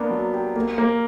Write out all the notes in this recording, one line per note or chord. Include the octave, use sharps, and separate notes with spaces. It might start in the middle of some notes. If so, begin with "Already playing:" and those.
Already playing: A#3 B3 D4
F#3
G4
A#3
A#3